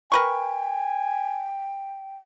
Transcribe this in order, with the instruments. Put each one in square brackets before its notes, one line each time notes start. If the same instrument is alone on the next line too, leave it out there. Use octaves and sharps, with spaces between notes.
[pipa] A#4 B4 C#6 [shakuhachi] G5 [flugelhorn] G#5